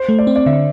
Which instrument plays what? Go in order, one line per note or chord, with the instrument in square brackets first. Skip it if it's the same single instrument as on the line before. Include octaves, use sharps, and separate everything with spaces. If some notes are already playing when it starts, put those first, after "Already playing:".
Already playing: [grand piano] C5
[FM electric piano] A3
[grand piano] D5
[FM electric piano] C4
[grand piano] D5
[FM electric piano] D3 [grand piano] E5